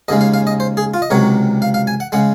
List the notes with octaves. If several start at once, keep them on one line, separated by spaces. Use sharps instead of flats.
D#2 C#3 G#3 D#5
F5
F5
D#5
C5
G#4
F4
D#5
C#2 C3 D#3 F#3 C#5
F5
F5
G#5
F#5
C#3 G#3 F#5